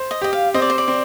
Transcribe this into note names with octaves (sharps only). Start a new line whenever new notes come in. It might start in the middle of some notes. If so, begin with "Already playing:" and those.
Already playing: C5
D#5
G4 D#5
F5
C4 D#5
D5
C5
D5
C4